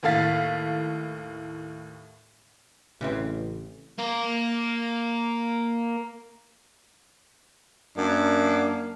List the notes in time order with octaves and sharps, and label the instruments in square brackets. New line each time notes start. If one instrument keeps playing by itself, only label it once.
[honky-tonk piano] D#2 A2 A4 F5 A6 B6
[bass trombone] A1 [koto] C#3 E3 C4
[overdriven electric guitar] A#3 A#4
[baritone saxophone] F#2 [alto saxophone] A#3 [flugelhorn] D4